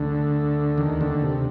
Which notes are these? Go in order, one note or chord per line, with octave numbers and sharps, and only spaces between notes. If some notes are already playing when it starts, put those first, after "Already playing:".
Already playing: D2 D3
D#2 D#3
D2 D3
C3